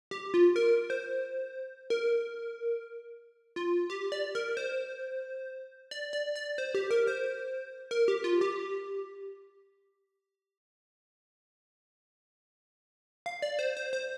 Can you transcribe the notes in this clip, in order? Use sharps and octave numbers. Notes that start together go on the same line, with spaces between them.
G4
F4
A#4
C5
A#4
F4
G4
D5
A#4
C5
D5
D5
D5
C5
G4
A#4
C5
A#4
G4
F4
G4
F5
D5
C5
C5
C5